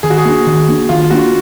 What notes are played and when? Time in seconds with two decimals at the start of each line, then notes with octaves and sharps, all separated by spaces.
0.03 D#3 G#4
0.10 F#4
0.18 G#4
0.25 A#3 D4
0.47 D#3
0.68 A#3 D4
0.89 D#3 F4
1.10 A#3 D4 F#4